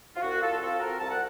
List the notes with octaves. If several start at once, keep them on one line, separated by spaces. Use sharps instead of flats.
F4
C2 F#4
C2 F4 A4
C4 F4 A4
C4 F#4 A#4
C2 A5
F#5